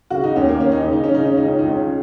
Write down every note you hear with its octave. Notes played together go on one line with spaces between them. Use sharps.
C#3 F#4
D#4
D#2 C#4
A#3
D#2 C#4
D#4
C#3 C#4
D#4
C#4
C#3 D#4
C#4
C#2 D#4
C#4
C#2 D#4
C#4
C#3